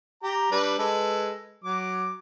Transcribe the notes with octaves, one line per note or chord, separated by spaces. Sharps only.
G4 A#5
G3 D4 B4
G#3 A4 B4
F#3 D6